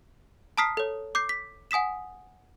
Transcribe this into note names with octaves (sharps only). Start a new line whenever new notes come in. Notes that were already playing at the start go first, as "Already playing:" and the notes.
A5 A#5 D#6 F6 B6 C7
A4 C#5
D6 G6 C7
B6
F#5 G#5 D#6 B6 E7